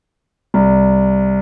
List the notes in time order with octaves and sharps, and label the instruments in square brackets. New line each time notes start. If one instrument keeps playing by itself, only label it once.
[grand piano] C2